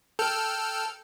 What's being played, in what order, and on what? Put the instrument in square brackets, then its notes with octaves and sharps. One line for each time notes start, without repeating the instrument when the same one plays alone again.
[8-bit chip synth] A4 G5 F6